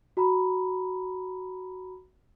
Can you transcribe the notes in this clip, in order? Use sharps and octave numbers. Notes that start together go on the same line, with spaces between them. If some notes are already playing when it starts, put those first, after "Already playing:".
F#4 A#5 B5